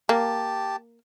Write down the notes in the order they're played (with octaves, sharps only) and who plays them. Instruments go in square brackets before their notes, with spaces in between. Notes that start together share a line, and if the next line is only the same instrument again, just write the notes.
[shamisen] A#3 [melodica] G4 A5